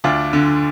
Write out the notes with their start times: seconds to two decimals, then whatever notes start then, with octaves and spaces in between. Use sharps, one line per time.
0.04 D2 D4 F4
0.33 D3